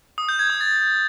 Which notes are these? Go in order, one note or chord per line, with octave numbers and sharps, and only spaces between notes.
D#6
G6
G#6
D#6
A6